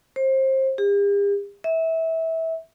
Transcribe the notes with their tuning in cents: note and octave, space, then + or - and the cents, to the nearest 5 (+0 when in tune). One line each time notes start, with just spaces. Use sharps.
C5 +25
G4 +45
E5 -25